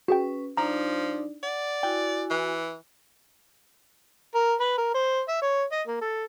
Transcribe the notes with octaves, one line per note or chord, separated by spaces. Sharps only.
C#4 F#4 G#4 B4 G5
F3 D4 D#4 D5 A#5
D5 F#5
E4 F#4 G5 G#5
E3
A#4
B4
A#4
C5
E5
C#5
D#5
A#3
A4